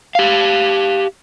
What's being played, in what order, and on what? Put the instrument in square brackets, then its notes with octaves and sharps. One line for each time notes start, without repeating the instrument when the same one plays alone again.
[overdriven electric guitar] G4 F5